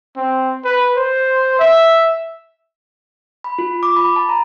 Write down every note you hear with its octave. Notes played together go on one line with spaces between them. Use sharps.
C4
B4
C5
E5
B5
F4
D6
B5
A5
A#5